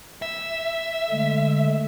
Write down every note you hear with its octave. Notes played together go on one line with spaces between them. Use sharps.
E5
D3 G#3 A3